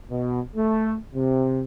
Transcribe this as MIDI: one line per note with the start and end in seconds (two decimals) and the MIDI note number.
0.10 0.40 47
0.55 0.95 57
1.14 1.63 48